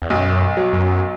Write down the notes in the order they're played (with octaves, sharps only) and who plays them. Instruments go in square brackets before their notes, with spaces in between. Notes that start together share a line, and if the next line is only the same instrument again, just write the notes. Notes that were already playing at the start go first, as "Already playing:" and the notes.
[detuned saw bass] E2
[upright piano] B1 [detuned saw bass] F#2
[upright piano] F#3
[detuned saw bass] F#2